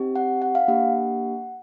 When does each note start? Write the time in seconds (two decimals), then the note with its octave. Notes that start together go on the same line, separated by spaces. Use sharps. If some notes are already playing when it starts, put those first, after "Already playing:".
Already playing: C4 D#4 G4
0.16 F#5
0.42 F#5
0.55 F5
0.68 A#3 D4 G4 F#5